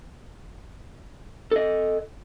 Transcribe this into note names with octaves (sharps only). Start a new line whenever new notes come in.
A4 D#5